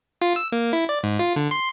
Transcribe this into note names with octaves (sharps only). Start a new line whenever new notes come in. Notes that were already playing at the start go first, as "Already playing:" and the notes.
F4
E6
A#3
E4
D5
G#2
F4
D3
C6